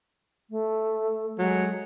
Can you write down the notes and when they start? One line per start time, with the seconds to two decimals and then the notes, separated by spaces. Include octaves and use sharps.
0.50 A3
1.39 F#3 G#3